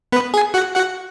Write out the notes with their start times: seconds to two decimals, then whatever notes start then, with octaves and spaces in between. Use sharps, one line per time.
0.12 B3 B4
0.34 G#4 G#5
0.54 F#4 F#5
0.76 F#4 F#5